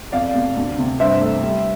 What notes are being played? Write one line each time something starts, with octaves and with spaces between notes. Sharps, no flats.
F2 D5 F5
F1
D2
C3
G2 C5 E5
A3
G3